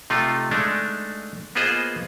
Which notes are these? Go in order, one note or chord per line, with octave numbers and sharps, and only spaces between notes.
C3 A3 D#4 F4
G#3 A3 D4 D#4
A#3 B3 F4 G#4 C5 D#5